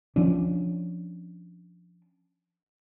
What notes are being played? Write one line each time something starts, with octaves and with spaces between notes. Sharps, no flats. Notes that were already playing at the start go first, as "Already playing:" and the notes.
F3 C#4 D4